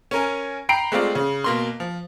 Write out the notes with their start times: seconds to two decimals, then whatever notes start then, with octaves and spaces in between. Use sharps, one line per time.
0.11 C#4 A#4 G#5
0.69 G5 A#5 B5 C7 D7
0.92 G#3 A3 C4 F4 D5
1.15 C#3
1.44 B2 A#3 C6
1.80 F3